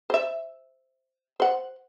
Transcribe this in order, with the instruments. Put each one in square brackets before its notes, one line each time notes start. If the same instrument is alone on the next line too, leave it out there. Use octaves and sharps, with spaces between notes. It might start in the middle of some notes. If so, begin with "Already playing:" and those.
[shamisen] C5 E5
C5 F#5